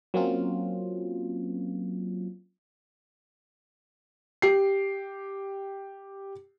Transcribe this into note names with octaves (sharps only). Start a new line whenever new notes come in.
F#3 A#3 C4 C#4 F4
G4 C7